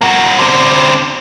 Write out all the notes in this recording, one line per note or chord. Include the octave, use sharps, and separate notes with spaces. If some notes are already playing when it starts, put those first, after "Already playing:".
A#3 F#4
D3 C4